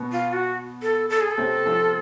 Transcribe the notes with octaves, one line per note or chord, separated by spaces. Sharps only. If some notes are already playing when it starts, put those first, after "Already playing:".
Already playing: B2 B3
F4
F#4
A4
A4
G#4
A4
C3 C4
F3 F4